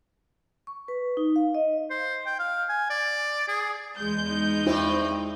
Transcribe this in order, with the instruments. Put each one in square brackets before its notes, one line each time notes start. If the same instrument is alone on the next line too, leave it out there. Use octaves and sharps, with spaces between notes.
[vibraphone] C#6
B4
D#4
F5
D#5
[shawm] C5
G5
F5
G#5
D5
G#4
[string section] E2 G#3 G6
[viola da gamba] D#4
[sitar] G2 C4 [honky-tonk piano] E4 C5